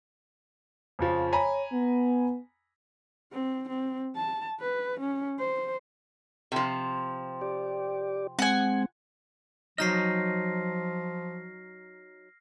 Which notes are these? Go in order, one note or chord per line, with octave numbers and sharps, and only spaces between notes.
F2 C#3 F3
C#5 G#5 A#5 B5
B3
C4
C4
A5
B4
C#4
C5
C3 F3
G4 D5
G#3 C4 F#5 G#5
F3 F#3 D#4 D#5 F6 A#6 C7